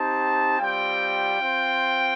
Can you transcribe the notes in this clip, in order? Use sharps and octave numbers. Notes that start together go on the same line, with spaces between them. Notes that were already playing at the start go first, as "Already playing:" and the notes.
Already playing: C4 D#4 G4 A5
G3 C4 F4 G5
C4 F4